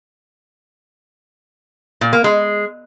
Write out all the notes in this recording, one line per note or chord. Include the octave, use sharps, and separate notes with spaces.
A#2
A#3
G#3